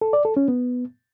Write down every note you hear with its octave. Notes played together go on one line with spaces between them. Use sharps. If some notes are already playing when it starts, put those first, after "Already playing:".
A4
D5
A4
C#4
B3